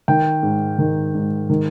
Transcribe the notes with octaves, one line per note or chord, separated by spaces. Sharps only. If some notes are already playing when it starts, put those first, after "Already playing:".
D#3 G5
G#2
D#3
G#2
D#3